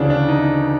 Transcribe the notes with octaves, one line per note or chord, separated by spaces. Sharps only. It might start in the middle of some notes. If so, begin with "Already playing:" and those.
Already playing: D2 C#3 E3 D4
D4
D#4